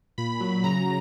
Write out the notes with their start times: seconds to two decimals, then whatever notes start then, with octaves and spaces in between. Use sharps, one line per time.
0.18 A#2 B5
0.40 F#3
0.64 C#3 A#5